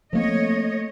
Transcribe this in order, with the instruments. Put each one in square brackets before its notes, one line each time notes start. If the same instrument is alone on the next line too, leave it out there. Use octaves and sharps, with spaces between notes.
[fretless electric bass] F3 A#3 C4 [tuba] A3 [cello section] C#5 D#5